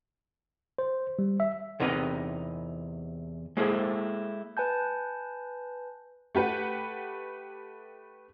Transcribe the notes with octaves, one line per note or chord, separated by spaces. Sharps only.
C5
G3
E5
E2 C3 D#4 A#4 B4 D#5
G#3 A#3 E4 G#4 A4 C5
B4 G#5 A5 G6
A3 G4 B4 F#5